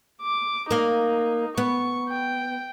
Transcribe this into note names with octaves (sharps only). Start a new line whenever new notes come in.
D6
A#3 D#4 A#4
B3 C#6
G5